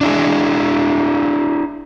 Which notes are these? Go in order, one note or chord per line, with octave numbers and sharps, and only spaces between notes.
D4 E4 G#4